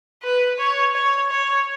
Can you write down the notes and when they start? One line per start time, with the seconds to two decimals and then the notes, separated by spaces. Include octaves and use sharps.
0.23 B4
0.59 C#5
0.95 C#5
1.30 C#5